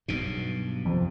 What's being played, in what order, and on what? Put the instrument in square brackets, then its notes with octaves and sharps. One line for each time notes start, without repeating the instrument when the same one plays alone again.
[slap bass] B1 G2 B2
[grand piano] F2 C3